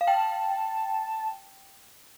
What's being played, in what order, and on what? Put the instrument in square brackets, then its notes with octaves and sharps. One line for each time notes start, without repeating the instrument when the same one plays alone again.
[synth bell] F5
[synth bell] G5 [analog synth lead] A5